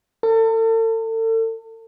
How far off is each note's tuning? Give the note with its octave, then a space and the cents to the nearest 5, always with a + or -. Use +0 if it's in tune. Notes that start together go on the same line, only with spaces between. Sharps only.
A4 +40